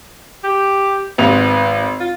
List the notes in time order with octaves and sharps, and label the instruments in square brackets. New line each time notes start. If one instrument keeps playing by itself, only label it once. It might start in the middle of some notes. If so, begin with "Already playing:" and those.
[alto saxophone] G4
[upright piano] G#1 F7 [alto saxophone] B3
[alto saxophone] F4